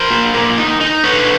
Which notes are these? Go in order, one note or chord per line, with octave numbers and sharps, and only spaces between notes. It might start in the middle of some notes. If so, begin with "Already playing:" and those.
Already playing: A#4 C5
A#2
A#3
D#4
D#4
D3 B4 C#5